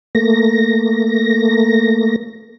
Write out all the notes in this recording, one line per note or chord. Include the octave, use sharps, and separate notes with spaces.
A3 A#3 A#6